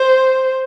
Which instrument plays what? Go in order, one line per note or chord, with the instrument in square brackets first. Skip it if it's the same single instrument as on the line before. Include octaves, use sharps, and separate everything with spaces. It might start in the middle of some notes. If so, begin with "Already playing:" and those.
Already playing: [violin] C5